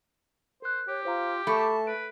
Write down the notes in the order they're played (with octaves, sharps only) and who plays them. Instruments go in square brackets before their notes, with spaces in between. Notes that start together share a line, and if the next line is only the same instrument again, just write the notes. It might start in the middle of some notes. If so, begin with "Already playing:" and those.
[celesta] A#4 F#6 [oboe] C5
[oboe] G4 [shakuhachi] C#5
[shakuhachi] F4 [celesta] C5 F5 A#5
[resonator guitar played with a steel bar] A3 [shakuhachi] A5 [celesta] B5 C#6 D6
[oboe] B4 [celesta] D7